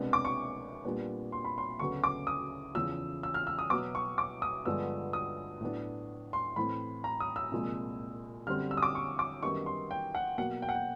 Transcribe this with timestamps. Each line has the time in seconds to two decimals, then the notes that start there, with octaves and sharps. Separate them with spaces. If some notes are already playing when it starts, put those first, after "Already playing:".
Already playing: C2 B2 G#3 B3 D4
0.13 D6
0.25 C#6
0.85 A#2 G3 B3 D4
1.32 C6
1.45 B5
1.58 C6
1.79 D2 C#3 F#3 B3 C#6
2.04 D6
2.27 D#6
2.75 E2 C#3 F3 E6
3.23 E6
3.34 F6
3.47 E6
3.59 D#6
3.70 B2 F#3 B3 D6
3.95 C#6
4.18 D6
4.42 D#6
4.65 G2 D3 F3 G#3 B3 E6
5.13 D#6
5.61 A2 F#3 B3 D4
6.33 C6
6.56 A2 E3 A3 C4 B5
7.04 A#5
7.20 D#6
7.36 E6
7.52 C2 A#2 F3 G#3
8.47 F#2 D3 G3 C4 F6
8.71 E6
8.77 D#6
8.83 D6
8.95 C#6
9.19 D6
9.43 F#2 D#3 G3 B3 C#6
9.66 C6
9.91 G5
10.15 F#5
10.38 B2 F#3 A#3 F#5
10.62 G5
10.69 F#5
10.75 G5